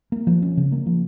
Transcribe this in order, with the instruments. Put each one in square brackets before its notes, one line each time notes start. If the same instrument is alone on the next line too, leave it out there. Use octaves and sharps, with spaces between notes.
[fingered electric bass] A#3
F3
C#4
C#3
A#3
F3